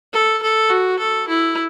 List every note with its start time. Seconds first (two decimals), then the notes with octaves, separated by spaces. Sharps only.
0.13 A4
0.42 A4
0.70 F#4
0.99 A4
1.28 E4